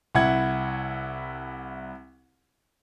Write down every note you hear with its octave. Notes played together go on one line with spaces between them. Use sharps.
C2 E4 F#5 G#6